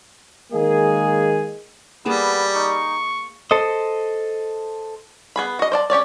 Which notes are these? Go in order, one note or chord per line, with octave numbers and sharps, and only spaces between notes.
D#3 G#3 A#3 G#4
G3 A#3 B3 G#4 A5
D#4 C#6
A4 C5 D#5
B3 G#4 B5
F#4 D#5
C5 D5 A5
C#4 G4 C#5 D5